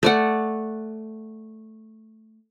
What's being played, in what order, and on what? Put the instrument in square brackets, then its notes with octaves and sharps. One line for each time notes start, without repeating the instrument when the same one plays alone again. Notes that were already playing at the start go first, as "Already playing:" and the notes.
[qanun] A3 D5 F#5